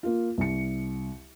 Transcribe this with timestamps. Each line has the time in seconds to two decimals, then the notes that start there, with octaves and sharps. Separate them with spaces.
0.03 A#3 F4
0.38 C2 C#7